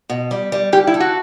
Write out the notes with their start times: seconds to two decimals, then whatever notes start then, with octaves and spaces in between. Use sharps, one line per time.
0.10 B2
0.31 G3
0.52 G3
0.72 G3 G4
0.87 E4
0.94 A4
1.00 F#4